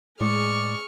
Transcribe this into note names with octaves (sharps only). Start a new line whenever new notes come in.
A2 G#3 G#4 D5 C#6 F6